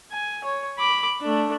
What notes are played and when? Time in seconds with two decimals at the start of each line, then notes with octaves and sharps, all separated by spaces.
0.12 G#5
0.44 C#5
0.78 B5 D6
1.21 A3 D4